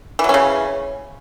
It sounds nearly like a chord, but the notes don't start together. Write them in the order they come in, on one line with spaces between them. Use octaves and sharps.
E3 F#3 C#4 C#3